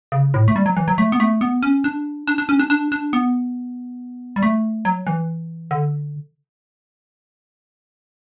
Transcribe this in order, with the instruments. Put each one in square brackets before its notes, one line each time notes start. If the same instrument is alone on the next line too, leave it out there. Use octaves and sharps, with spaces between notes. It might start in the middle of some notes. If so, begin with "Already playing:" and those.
[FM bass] C#3
A2
A3
G3
F#3
E3
F#3
A3
B3
A3
B3
C#4
D4
D4
D4
C#4
D4
D4
D4
B3
G3
A3
F#3
E3
D3